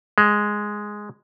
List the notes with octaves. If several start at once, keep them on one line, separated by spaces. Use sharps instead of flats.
G#3